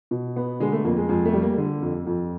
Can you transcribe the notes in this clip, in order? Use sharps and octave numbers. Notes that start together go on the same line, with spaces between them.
B2
B3
D3 G#3
A3
F2 A#3
G#3
F2 G#3
A3
G3
A#3
D3
F2
F2